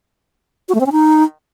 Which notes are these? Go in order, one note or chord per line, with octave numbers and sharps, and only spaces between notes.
F#4
A3
C4
C#4
D#4